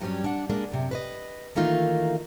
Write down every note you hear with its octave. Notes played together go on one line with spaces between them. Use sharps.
G2 F#3 G3 B3 C#4
D4 F#5
G#3 A#3 D4
F#2 C3
B4 C5 D#5
D#3 E3 A3 A#3 D#4 F4